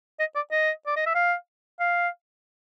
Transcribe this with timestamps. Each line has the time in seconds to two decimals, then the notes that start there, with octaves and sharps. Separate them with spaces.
0.20 D#5
0.36 D5
0.51 D#5
0.87 D5
0.96 D#5
1.06 E5
1.15 F5
1.80 F5